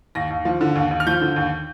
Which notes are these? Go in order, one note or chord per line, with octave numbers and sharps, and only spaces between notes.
D#2 A#6
D#2
F3
D3
D#2
D#2
F6
F3 G6
D3
D#2